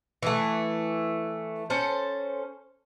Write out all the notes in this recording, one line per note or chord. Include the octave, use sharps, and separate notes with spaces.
E3 A3
C#4 A4 C5